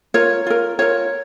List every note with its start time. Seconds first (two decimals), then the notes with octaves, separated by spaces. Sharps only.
0.14 F4 A#4 C#5
0.47 F4 A#4
0.79 F4 A#4 C#5